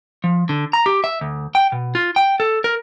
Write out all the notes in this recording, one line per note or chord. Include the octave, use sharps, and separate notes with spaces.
F3
D3
A#5
G4
E5
D2
G5
B2
F4
G5
A4
A#4